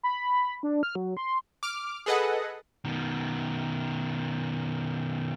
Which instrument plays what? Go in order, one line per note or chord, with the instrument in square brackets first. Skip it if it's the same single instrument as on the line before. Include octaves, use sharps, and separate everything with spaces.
[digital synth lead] B5
D4
F6
F#3
C6
[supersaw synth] D6 F6
G#4 A4 B4 D#5 F#5
[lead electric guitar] B2 D#3